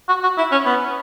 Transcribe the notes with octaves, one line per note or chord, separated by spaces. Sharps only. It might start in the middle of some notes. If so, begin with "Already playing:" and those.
F#4
F#4
E4
C#4
B3